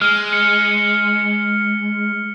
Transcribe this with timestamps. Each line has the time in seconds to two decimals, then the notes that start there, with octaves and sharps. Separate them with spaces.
0.01 G#3 F6
0.33 C#7